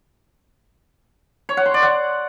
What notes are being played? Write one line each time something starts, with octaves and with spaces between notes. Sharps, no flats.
C#5
F#5
C6
D5
F#5